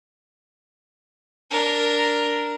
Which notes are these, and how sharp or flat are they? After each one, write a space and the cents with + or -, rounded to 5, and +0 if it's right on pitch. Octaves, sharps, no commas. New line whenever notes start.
D4 +0 A#4 +0